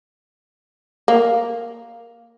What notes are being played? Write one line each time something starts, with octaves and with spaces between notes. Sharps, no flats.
A#3